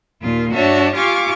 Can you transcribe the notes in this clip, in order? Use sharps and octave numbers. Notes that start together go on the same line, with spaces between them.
D#2 A#2 F4
G2 D4 F#4 C#5 E5 A5
F4 G4 F5 G#5 C#6 D6